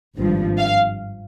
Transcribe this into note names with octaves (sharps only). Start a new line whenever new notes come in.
G#1 G2 F3
F5